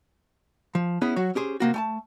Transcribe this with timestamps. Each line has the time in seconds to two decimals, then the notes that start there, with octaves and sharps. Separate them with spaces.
0.75 F3
1.02 B3 C#4 E4 G#4
1.16 F#3 F#4 C#5
1.35 C#4 G4 G#4 C5
1.60 C3 A#3 F#4
1.74 A3 G#5 A5